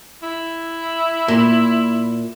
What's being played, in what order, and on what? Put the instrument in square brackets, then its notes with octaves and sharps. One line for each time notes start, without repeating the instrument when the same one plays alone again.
[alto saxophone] E4
[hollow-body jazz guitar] A#2